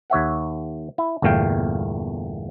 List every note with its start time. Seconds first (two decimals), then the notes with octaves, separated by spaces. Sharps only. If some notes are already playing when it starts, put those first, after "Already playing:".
0.10 D#2 C#5 E5 F#5
0.98 E4
1.22 G1 E2 A#2 A3 F5 G5